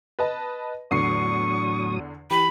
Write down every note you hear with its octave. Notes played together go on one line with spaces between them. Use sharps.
B4 D#5 A5
E2 A2 D3 F#3 C#6 D#6 C7
E3 G4 B5